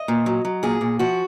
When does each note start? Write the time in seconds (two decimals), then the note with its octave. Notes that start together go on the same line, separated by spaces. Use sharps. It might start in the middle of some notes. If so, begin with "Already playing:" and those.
Already playing: D#5
0.08 A#2
0.26 F#3
0.45 F#3
0.63 A#2 G#4
0.81 A#2
0.99 F3 F#4